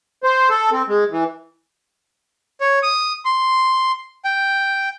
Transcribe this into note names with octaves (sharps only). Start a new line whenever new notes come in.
C5
A4
C4
G#3
E3
C#5
D#6
C6
G5